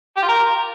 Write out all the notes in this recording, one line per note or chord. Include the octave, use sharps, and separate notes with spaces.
G4
F4
A#4